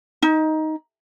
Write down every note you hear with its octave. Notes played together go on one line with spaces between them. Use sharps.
D#4